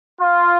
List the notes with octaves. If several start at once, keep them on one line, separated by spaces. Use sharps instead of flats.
F4